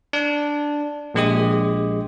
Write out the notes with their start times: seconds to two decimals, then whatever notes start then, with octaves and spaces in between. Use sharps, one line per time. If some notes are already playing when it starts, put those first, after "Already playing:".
0.13 D4
1.14 A#1 G#3 G4 D#6